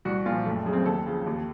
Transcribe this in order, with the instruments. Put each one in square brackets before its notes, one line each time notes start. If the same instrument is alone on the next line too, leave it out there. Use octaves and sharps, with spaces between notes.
[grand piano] C2 F#4
A#2 F3 F4
F#1 A3
F#2 C#3
C4
D#2 A4
C#3 F3
D#2